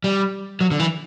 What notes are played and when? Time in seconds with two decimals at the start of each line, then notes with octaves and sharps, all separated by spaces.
0.04 G3
0.61 F#3
0.71 D3
0.79 E3